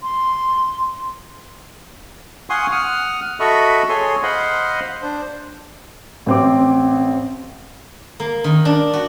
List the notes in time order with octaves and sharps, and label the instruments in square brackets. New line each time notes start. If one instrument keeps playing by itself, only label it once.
[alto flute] C6
[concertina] F5 F#5 G#5 C6 C#6 D#6
F#5 D#6 F6
F#4 A4 D#5 E5 B5 C#6
G#4 A4 C#5 G#5 C6
C5 D#5 F5 F#5 B5 C6
D4 C5
[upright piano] A1 C4 D6
[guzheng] A#3
D#3
D4
F#4